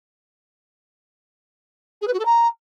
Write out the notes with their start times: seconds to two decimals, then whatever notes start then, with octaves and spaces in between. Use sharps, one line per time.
2.02 G#4
2.07 B4
2.13 F#4
2.19 A4
2.25 A#5